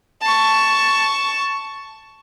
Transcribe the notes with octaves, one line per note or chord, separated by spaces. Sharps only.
A5 C#6